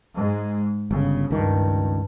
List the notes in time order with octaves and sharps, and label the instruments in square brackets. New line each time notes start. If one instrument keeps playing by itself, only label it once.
[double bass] G#2 G#3
[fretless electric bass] G1 [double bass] C#3
[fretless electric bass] C#2 D#3 [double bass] G2